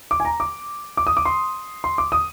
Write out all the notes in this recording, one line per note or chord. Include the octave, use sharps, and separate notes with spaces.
D6
G#5
A#5
D6
D6
D#6
D6
C6
C6
D6
D#6